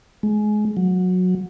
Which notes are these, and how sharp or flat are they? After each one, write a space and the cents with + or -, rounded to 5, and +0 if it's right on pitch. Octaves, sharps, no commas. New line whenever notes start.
G#3 +25
F#3 -20